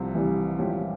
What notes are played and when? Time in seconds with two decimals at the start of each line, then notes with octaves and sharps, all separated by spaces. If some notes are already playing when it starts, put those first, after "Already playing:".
Already playing: C2 C3 F3
0.15 E3 G3
0.58 A#2 F3 G#3 C#4 G4